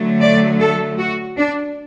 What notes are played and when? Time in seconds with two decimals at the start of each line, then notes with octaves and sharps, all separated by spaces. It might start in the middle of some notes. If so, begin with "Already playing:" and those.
Already playing: D3 F#3 A3
0.21 D5
0.60 A4
0.99 F#4
1.38 D4